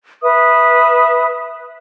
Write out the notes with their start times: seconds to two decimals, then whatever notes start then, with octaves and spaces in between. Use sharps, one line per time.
0.22 B4 E5 D#6